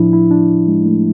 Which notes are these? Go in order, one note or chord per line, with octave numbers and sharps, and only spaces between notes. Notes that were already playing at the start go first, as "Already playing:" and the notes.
Already playing: A2 F3 D4 E4
E4
D4
G#3
A3